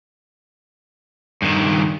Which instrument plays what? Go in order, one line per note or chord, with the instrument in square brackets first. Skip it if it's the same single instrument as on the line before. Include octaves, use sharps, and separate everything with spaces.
[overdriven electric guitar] G2 D#3